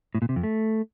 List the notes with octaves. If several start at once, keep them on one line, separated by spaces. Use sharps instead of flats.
A2
A#2
C3
F2
A3